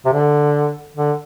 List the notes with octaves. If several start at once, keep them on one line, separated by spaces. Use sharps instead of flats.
C3
D3
D3